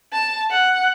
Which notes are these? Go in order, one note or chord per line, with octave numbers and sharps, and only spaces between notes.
A5
F#5